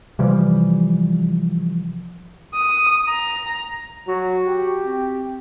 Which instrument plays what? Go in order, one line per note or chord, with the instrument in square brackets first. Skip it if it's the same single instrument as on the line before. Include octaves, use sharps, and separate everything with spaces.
[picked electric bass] C3 E3 F3 G3
[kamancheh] D#6
A#5
[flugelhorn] F#3 [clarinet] F#4
[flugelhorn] G4
[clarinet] C4